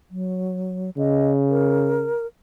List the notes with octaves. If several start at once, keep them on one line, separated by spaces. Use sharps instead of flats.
F#3
C#3 D#5
A#4